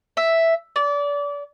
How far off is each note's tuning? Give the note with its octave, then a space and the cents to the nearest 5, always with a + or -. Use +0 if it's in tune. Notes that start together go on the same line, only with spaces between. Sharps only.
E5 +0
D5 -30